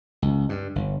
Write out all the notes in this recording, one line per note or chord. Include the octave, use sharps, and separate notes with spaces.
C#2
G2
G1